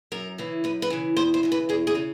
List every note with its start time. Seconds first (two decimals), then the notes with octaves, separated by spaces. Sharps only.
0.12 F#2 A#4
0.38 C#3 E3
0.64 F#2 B4
0.82 B4
0.90 C#3 E3
1.17 E2 C5
1.34 C5
1.43 C#3 E3
1.52 B4
1.69 E2 G#4
1.87 G#4
1.95 C#3